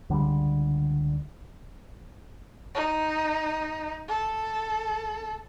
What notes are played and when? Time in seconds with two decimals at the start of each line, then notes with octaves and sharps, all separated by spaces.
0.09 C#2 D3 F3 G3
2.75 D#4
4.08 A4